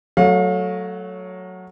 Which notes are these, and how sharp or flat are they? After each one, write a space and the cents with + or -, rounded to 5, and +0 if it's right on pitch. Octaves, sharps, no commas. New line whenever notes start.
F#3 +0 A3 +0 F5 +35